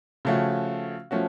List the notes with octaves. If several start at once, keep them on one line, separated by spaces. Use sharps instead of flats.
C#3 F3 A3 C#4 F#4
F3 A3 C#4 F#4